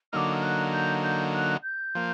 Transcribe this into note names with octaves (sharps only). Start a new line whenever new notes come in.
D3 F#3 A#3 D#4 D6 F6
F6
F#6
G6
G6
F#6
G6
F3 A#3